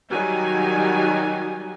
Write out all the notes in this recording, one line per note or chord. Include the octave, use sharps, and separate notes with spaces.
D#3 F#3 G3 D#4 F#4 G#5